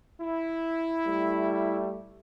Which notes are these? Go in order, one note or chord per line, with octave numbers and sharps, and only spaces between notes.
E4
G3 A3